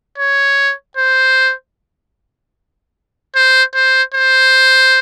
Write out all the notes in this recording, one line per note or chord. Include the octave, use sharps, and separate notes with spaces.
C#5
C5
C5
C5
C5